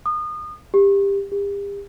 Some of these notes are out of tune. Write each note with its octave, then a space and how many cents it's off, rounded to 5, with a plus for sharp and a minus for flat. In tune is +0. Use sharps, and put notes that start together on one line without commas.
D#6 -30
G4 +20
G4 +40